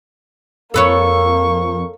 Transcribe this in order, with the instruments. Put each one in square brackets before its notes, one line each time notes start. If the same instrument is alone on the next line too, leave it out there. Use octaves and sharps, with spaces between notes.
[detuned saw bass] F2 [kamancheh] A#3 C#6 [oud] A4 B4 C#5